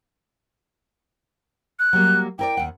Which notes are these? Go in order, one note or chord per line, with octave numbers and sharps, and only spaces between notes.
F#6
F#3 G3 A#3
E4 A#4 D5 G5
D#2 F#5